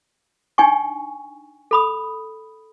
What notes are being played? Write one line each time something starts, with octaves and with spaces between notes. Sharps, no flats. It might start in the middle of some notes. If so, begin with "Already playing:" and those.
D4 D#4 G5 G#5 C#6
A4 B5 D#6